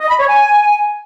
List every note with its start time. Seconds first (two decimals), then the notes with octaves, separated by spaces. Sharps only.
0.01 D#5
0.10 B5
0.19 C#5
0.29 G#5